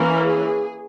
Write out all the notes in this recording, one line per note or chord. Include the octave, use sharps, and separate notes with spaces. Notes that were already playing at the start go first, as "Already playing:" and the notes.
Already playing: E3 A#3 C#4 A#4
G#4